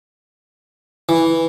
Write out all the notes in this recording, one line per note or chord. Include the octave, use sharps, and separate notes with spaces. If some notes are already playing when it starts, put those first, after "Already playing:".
E3